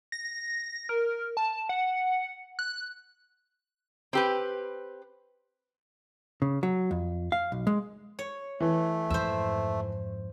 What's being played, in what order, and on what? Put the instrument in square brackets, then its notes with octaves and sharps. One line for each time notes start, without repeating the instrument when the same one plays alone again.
[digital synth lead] A#6
A#4
A5
F#5
F#6
[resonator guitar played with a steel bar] C4 G4 B4
[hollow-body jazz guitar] C#3
F#3
F2
F5
B1
G#3
[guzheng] C#5
[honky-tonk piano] E3 [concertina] A3
[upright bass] F2 G#2 [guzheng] C5 E5